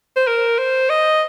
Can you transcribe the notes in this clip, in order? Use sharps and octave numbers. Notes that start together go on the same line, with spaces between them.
C5
A#4
C5
D#5